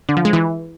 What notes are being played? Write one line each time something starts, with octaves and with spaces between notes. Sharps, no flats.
D3
F3
G#3
E3